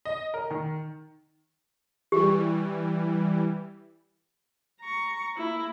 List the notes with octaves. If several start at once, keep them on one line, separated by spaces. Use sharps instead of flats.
D#5
A#4
D#3
E3 G3 G4
A#5 C#6
A#3 E4